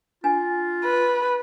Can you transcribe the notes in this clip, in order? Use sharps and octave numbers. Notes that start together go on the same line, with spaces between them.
D4 F4 G#5
B4